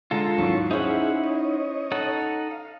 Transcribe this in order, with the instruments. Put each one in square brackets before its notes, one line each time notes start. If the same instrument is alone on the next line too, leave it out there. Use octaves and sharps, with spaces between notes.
[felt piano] D3 G#3 [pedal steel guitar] F4 A4 [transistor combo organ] A#5
[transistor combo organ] D#2 C#4 C#6 [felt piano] G#2 E3 F#3
[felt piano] C#4 C5 [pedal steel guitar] D#4 E4 F#5 [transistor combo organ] G#4 E5
[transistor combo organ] C#5 D#5
[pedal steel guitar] D#4 A4 F#5
[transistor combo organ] F5